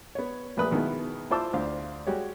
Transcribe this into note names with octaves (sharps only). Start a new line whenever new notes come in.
B3 C#5
A#1 A3 B4 D#6
B2 D#3 G#3 B3 E4
E4 F4 C5 A5 D6 E6
D2 D4 C5 F5
G3 G#3 F#4 G4 C#5